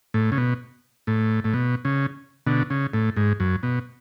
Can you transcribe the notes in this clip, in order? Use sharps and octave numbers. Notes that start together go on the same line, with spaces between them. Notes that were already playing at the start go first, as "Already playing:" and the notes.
A2
C#3
B2
A2
A2
B2
C#3
B2 D3
C#3
A2
G#2
F#2
B2